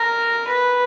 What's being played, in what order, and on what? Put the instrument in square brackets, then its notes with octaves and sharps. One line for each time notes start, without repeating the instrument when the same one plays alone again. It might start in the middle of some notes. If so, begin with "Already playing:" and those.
Already playing: [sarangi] A#4
B4